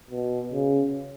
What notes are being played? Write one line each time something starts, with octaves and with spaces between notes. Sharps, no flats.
B2
C#3